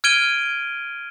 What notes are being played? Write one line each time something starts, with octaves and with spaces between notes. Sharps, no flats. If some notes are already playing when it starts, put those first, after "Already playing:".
F6 G#6 D7 D#7 G7